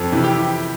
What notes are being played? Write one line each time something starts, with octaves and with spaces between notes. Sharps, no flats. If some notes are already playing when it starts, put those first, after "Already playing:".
Already playing: F2 A4
C3 E3
G4